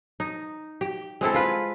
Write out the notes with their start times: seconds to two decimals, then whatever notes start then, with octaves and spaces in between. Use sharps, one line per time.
0.20 D#4
0.81 G4
1.21 G#3 C4 E4 A4
1.34 F4 B4